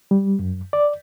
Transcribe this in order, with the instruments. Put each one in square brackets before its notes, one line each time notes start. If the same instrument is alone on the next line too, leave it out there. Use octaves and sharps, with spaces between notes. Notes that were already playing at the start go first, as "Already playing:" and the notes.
[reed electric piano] G3
F#2
D5